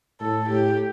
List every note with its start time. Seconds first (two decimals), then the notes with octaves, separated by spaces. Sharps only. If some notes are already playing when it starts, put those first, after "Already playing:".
0.21 A2 A4
0.49 A2 G4